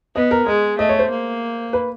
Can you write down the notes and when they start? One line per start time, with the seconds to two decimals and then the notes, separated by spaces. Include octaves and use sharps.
0.15 B3 D#5
0.31 A#4
0.47 G#3 D#5
0.78 A3 D#5
0.89 C#5
0.99 C5
1.10 A#3
1.73 B4